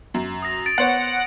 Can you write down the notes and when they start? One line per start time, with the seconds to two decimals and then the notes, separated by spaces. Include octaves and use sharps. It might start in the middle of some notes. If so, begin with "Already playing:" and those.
0.14 F#2
0.42 D#6 A#6
0.66 A6 D7
0.78 B3 C5 C#5 F#5